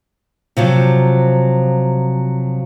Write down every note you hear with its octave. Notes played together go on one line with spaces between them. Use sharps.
C3 F3 F#3